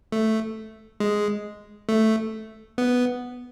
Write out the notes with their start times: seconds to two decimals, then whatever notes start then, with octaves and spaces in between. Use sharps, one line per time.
0.12 A3
1.00 G#3
1.89 A3
2.78 B3